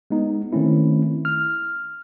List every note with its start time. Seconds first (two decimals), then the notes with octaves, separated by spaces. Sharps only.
0.10 G#3 B3 D#4
0.53 D#3 A3 C4 C#4 E4
1.25 F6